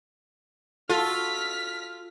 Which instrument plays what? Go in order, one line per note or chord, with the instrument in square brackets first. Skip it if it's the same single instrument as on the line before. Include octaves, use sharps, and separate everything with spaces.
[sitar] F4 [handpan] F#4 A4 [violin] F6 B6